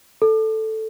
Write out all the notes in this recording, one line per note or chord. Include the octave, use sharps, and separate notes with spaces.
A4